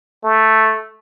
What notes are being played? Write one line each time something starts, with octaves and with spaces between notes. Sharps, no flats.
A3